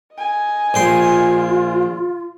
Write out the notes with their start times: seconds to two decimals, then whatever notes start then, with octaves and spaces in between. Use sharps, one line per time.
0.14 D#5 G#5
0.74 A#1 F4 G5 C6